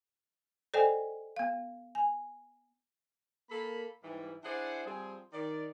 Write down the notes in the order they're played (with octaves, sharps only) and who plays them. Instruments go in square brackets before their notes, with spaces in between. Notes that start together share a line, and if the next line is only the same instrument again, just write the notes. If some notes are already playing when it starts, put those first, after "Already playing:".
[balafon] A4 C5 D5 D#5 G5 G#5
B3 F5
G#5
[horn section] A#3 A4 B5
G#2 E3 G3
D4 E4 G#4 C5 D5 F#5
F3 G3 C4 G#4
D#3 D5